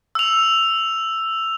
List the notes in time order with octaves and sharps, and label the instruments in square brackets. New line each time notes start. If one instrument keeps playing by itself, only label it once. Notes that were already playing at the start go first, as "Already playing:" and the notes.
[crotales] E6 F7